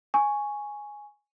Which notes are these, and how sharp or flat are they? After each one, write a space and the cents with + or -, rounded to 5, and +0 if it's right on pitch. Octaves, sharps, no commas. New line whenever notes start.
G#5 +0 C#6 +0